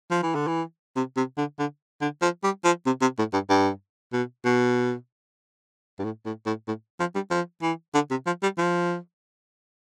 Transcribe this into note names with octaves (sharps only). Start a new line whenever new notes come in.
F3
E3
D3
E3
C3
C3
D3
D3
D3
F3
G3
F3
C3
C3
A2
G2
G2
B2
B2
G2
A2
A2
A2
A2
F3
G3
F3
E3
D3
C3
F3
G3
F3